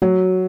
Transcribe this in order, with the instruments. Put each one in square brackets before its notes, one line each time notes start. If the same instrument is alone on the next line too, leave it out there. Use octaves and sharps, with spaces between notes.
[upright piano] F#3 [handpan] F#4